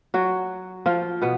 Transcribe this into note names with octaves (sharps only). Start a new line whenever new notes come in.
F#3 F#4
F3 F4
B2 B3